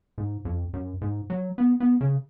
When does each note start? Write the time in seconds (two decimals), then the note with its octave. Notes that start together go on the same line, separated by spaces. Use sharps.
0.18 G#2
0.45 F2
0.73 F#2
1.01 G#2
1.30 F#3
1.58 B3
1.80 B3
2.01 C#3